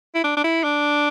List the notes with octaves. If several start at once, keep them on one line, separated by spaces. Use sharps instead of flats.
E4
D4
D4
E4
D4